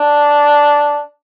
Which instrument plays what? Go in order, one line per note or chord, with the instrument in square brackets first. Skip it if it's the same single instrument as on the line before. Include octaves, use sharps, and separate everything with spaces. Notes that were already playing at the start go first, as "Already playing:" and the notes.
Already playing: [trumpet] D4